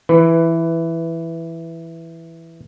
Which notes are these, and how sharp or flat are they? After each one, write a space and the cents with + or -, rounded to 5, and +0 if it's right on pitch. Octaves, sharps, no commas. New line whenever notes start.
E3 +5 B4 +15